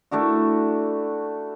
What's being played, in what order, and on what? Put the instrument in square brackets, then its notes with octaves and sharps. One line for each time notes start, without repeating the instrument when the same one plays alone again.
[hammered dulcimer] A3 D4 E4 F#4